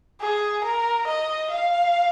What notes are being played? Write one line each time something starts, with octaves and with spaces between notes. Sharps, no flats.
G#4
A#4
D#5
F5